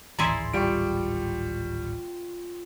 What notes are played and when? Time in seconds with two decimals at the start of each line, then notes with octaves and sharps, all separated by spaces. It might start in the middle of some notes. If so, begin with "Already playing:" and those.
0.19 D1 G#1 E3 E4 G#4 D5 A#5 C6
0.54 G3 F4 G5 C#6 D7